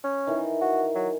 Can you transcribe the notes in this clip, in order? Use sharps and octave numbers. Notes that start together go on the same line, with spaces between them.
C#4
D#3 E3
F#4
F#3